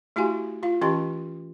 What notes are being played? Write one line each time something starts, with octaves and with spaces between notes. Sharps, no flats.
A3 E4 F#4 G4 F5 G#5
F4 F5
E3 C#4 G4 D#5 A5 C6